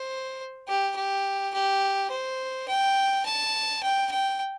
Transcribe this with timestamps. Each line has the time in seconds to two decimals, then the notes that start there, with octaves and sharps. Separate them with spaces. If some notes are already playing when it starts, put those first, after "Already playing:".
Already playing: C5
0.68 G4
0.96 G4
1.54 G4
2.11 C5
2.69 G5
3.26 A5
3.83 G5
4.11 G5